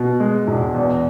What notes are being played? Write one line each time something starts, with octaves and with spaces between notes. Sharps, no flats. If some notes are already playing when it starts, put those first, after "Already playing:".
Already playing: B2
G#3
E1
E2